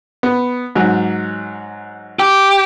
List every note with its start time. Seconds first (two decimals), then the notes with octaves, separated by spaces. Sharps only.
0.23 B3
0.75 G#2 F#3
2.20 G4